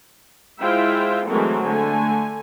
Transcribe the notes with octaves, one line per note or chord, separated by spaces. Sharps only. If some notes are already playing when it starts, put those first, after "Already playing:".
G#3 E4 F4 C5 E5 G5
E3 F#3 G#3 A3 C4 A#4
D3 A3 G#5